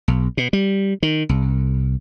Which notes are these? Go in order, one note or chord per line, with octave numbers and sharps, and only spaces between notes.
B1
B2
G3
D#3
C2